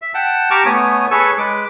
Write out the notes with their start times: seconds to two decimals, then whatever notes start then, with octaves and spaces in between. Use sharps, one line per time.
0.02 E5
0.14 F#5 G5 A5
0.51 G4 A5 A#5 C#6 D6 F6
0.66 A3 B3 C#5 G#5 D#6
1.11 G#4 A4 B4 C#5 C#6 E6
1.38 G#3 B4 D6